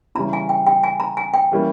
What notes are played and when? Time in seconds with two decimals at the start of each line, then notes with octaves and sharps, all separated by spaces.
0.15 C#3 E3 G3 C#4 A#5
0.33 G#5
0.49 G5
0.67 G5
0.84 G#5
1.00 A#5
1.17 G#5
1.34 G5
1.52 E3 G3 A#3 C#4